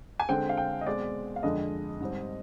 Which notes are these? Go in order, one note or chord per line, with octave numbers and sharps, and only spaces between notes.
G#5
D3 G#3 C4 G5
F5
G5
D#5
B2 G#3 C4 D5
F5
F2 D3 G#3 D4 D#5
G#2 G3 C4